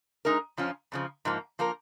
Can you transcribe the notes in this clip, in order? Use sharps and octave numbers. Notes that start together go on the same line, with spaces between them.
G#3 D#4 A#4
F2 F3 C#4 F4
F2 C#3 F3
G#2 F3 A#3
F3 A#3 F4 A#4